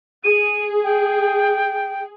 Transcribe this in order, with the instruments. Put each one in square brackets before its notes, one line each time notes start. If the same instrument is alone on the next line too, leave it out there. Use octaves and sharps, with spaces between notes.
[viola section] G#4 [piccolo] D#7
[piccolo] G5